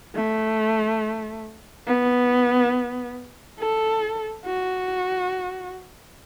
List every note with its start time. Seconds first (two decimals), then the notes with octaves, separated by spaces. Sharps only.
0.15 A3
1.87 B3
3.60 A4
4.46 F#4